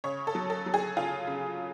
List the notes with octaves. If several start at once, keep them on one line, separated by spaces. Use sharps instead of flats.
C#3 C#5
A4
F#3
A4
F#3
G#4
C#3 F4
C#3